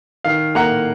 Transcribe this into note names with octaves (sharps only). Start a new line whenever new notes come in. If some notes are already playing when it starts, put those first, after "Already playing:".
D#3 F5
A#3 F#5 A#5